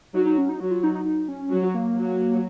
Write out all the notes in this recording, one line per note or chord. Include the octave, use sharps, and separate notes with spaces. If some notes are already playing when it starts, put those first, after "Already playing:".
F#3 D#4
D#4
C#4
D#4
F#3 F#4
F4
D#4
D#4
D#4
C#4
F#3
A#3
F#3